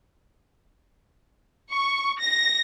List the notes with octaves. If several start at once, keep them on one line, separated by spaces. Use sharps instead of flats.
C#6
A#6